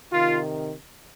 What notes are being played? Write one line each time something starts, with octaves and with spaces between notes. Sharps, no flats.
C3 D#3 F4